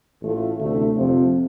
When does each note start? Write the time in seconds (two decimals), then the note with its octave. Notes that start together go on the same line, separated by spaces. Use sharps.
0.22 A1 A2 A3 F4
0.59 D2 C3 A3
0.95 F2 C3 F3 C4